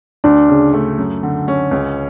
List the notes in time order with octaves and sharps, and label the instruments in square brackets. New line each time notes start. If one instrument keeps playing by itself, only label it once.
[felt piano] D2 [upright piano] D4
[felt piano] C#3
A3
F#2
D3
C#4
C#2